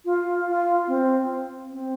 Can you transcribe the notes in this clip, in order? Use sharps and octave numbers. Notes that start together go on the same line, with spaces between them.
F4
F4
C4
C4